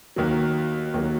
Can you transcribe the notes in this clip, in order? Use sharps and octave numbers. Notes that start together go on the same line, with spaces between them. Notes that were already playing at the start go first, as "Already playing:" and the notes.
D#2 D#3 F#3
D#2 D#3 F#3